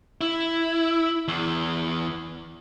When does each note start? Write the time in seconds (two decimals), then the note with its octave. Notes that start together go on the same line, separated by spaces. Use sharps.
0.21 E4
1.28 E2